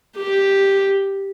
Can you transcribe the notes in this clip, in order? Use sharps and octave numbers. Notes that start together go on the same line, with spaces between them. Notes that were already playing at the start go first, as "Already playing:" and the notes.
G4